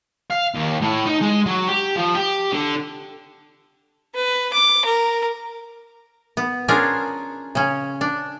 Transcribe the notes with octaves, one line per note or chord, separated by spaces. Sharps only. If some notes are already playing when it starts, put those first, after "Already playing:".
F5
D#2
A2
D#4
G#3
F#3
G4
F3
G4
D3
B4
D6
A#4
B3
C#4 D4 F4 G#4 A#4
C#3 C#4
D4